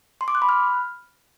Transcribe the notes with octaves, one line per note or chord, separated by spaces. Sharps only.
C6
D6
F#6
B5
F6